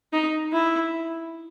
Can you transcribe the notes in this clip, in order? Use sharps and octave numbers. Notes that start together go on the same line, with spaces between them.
D#4
E4